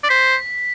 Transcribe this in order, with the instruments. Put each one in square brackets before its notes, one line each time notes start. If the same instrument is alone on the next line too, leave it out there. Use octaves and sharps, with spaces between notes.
[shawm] D5
[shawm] C5 [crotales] B6